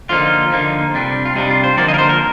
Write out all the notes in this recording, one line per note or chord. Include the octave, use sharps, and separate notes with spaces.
D3 F3 A#3 D#4 F4
D3 F3 A#3 D#4
C3 G3 D4
F4
C3 G3 D4 D#4
F4
C5
D3 F3 A#3 D#4 D5
D#5
A#4
C5
A#4